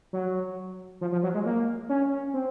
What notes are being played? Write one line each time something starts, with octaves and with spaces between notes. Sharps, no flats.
F#3
F3
F3
F#3
G#3
A#3
C#4
C4